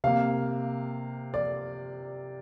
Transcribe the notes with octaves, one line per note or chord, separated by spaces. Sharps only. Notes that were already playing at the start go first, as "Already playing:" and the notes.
C3 A#3 F5
D5